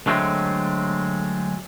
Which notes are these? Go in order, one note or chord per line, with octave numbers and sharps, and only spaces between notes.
D3 F#3 G#3 A3 C4